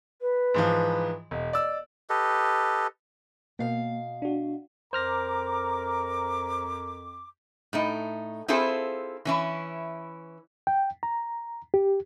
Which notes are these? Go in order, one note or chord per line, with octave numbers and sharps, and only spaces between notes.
B4
G#2 E3 F3
E1 D#5
D5 E6
G4 A4 B4 D#5
B2 A#3 F5
D4 F#4
F2 A#4 C5 A#5 D6 F6 A#6
A2 A3 D#4
C4 E4 F4 G#4 A4 C5
E3 C#4 E4
G5
A#5
G4